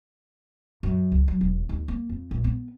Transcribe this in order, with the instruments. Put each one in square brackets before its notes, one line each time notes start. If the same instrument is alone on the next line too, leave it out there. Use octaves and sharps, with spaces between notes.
[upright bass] F#2
C#2
F#3
E1
D#2
A#3
F2
A#1
B3